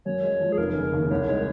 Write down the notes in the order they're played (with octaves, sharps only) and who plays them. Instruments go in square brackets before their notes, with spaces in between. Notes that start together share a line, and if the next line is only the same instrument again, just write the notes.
[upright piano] F#2 [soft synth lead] C#5
[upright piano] G#3
F3
[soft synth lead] G#4
[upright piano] F1 [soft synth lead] A#4
[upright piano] C#3
D#2
[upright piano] C2 [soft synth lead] C#5
[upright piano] G#3 [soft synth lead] C#5